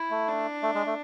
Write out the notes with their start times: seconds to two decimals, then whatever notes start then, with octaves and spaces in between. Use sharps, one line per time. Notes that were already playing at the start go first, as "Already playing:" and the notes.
Already playing: E4
0.10 A3
0.28 D4
0.63 A3
0.75 G#3
0.86 A3